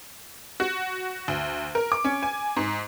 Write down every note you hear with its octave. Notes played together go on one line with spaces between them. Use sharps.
F#4
D2
A#4
D6
C#4
G#5
G#2